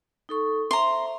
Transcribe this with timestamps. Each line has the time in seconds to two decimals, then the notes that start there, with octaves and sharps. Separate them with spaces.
0.29 D#4 A4 C#6
0.71 C5 E5 A#5 C6